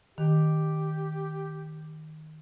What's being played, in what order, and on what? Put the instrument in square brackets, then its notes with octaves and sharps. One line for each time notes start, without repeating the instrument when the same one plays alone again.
[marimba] D#3 [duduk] G4